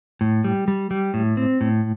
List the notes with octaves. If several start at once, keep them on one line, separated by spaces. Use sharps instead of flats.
A2
G3
G3
G3
A2
C4
A2